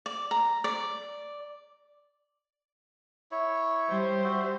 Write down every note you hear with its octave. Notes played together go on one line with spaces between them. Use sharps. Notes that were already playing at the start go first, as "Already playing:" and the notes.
D5
A#5
D5
E4 C#5
G3 C5
F#4 E5